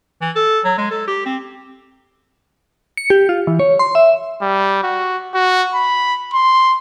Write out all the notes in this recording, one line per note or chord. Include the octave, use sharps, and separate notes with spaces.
E3
A4
F#3
G#3
A4
G4
C4
C#7
G4
F4
E3
C#5
C6
E5
G3
F#4
F#4
B5
C6